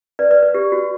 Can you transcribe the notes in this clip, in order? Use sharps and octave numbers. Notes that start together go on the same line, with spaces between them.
B4 D5
B4 D5
B4
G4
F#4